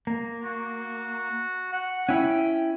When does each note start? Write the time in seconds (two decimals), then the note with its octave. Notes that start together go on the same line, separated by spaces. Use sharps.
0.07 A#3
0.44 F#4
1.73 F#5
2.09 C#4 E4 G5